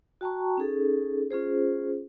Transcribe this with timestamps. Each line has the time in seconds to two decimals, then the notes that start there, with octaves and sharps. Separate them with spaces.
0.21 F#4 G5 A5 A#5 C#6
0.57 C#4 D#4 G#4 A4
1.31 C#4 F4 G#4 C5